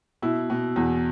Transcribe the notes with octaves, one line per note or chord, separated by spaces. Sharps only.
B2 E4
B2
E2